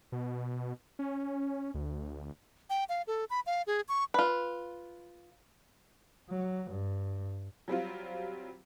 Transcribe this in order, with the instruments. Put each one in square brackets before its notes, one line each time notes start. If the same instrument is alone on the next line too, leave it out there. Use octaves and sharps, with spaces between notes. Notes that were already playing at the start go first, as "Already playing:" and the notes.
[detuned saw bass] B2
C#4
D2
[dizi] G5
F5
A4
B5
F5
G#4
C#6
[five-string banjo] F4 B4
[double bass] F#3
G2
[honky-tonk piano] F#3 G3 C4 F4